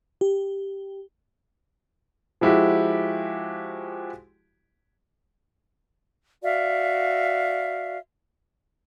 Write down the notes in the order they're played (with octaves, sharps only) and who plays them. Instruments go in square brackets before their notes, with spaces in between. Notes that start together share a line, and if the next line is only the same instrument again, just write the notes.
[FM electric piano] G4
[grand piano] F3 G#3 E4 F#4 G4
[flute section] F#4 D5 E5 F5